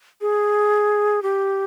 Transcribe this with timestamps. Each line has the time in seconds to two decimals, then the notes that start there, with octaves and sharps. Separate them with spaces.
0.21 G#4
1.23 G4